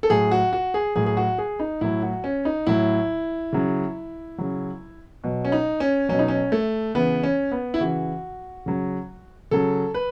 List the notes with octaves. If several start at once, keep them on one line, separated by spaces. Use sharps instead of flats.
A4
A2 F#3 G#4
F#4
F#4
G#4
A2 F#3 G#4
G#4
F#4
G#4
D#4
A2 F#3 E4
F#4
C#4
D#4
A2 F#3 E4
C#3 F#3
C#3 F#3
B2 F#3
C#4
D#4
C#4
B2 F#3 C#4
D#4
C#4
A3
C#3 E3 B3
C#4
B3
E4
C#3 E3 F#4
C#3 F#3
C#3 F#3 A4
B4